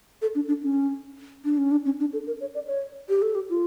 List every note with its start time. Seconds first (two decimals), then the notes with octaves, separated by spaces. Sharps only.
0.22 A4
0.35 D4
0.48 D4
0.63 C#4
1.45 D4
1.58 C#4
1.71 D4
1.85 C#4
2.00 D4
2.13 A4
2.27 A#4
2.41 C#5
2.55 D5
2.67 C#5
3.09 G4
3.22 A4
3.35 G4
3.50 F4